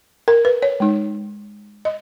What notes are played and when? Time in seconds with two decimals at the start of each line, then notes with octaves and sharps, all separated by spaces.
0.28 A#4
0.45 B4
0.62 C#5
0.80 G#3 D#4
1.85 D#5